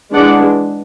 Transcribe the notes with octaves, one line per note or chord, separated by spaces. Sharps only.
E3 G#3 D4 D5 F#5